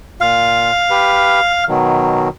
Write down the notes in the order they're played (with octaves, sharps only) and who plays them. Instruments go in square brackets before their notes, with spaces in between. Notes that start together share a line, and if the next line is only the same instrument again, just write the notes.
[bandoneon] A#2 F4 [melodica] F5
[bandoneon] G4 B4
B2 D#3 F#3